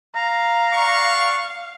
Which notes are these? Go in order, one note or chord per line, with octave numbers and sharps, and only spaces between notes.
F5 A#5
D5 F#5 C#6